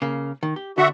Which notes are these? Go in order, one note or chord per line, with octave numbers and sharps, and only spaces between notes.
C#3 A#3
D#3
G4
D3 F#4 E5 F#5